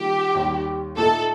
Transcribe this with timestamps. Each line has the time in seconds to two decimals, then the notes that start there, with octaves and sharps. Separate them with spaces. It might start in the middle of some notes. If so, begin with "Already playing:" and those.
Already playing: D#3 G3 A#3 F4 G4
0.35 D#2 D#3 G3
0.97 A#2 A3 D#4 A4